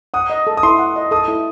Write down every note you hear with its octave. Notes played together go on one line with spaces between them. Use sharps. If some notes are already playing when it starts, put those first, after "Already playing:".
F#5 D#6
D#5
A4
D#6
E4 C6
F#5
D#5
A4 D#6
E4